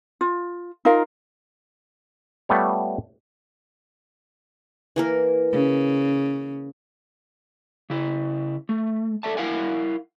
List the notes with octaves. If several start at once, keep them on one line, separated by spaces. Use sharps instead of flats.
F4
D#4 F4 A#4 F5
G3 A3 B3 F4 C#5
E3 A#3 A#4
C#3
C#3 E4
A3
A4 D5 E5 A5
E4 A#4 F5 F#5 G#5